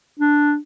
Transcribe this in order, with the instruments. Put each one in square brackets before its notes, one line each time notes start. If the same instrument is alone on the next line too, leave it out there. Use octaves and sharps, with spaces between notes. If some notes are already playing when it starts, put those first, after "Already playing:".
[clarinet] D4